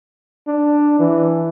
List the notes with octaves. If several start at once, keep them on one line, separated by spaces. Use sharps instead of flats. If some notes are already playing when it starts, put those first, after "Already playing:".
D4
E3